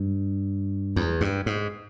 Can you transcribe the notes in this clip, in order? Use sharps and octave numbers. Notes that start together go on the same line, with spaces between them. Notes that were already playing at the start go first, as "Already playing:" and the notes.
Already playing: G2
E2
G2
G#2